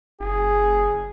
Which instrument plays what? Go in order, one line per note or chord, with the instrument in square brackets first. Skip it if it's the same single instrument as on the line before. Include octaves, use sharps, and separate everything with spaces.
[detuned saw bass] F#1 [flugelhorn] G#4